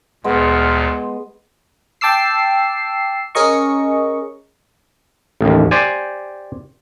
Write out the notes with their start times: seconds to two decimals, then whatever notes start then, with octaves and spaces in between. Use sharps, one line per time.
0.24 D2 A#2 G#3 B3
2.01 G5 A5 D6 E6 C7
3.35 C#4 G#4 A#4 D#5 C#6
5.41 A1 D#2
5.71 G4 C5 D5 G#5